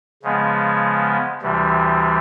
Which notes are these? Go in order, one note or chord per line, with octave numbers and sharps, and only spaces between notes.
C#3 F3 G#3 B3
D2 C3 E3 G3